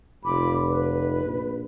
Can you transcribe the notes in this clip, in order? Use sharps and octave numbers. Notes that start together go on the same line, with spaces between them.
F1 F4 B5 D6
B4
A#1